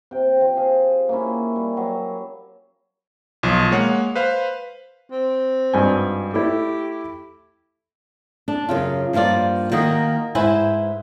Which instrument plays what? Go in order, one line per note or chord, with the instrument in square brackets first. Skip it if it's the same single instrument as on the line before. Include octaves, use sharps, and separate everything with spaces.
[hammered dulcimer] C3 G5
F3 G4
G#4 F5
A#3 C#4 E4
G3
F#3
[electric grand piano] B1 F3
G#3 A#3 C#5 F#5
B4 C5 F5
[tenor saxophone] C4
[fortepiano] G#1 G2 G#5
[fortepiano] A3 E4 [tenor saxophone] G4
[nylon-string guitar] D4
F#2 C#3 F4
G2 F3 A#3 F4 D5
D#3 A#3 F#4 D#5
G#2 E4 B4 C5 G#5